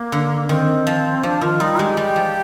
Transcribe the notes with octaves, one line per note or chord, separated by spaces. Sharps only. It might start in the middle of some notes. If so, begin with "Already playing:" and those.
Already playing: A#3
D3
D#3 C4
F3
F3 D4
D#3 F4
G3 D#4
G#3 G4
G3
F3